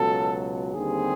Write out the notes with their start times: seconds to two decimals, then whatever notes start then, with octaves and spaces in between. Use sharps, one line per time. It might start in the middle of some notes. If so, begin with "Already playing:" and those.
Already playing: C#2 B2 F#3 A4
0.74 D#2 D3 G3 C4 G#4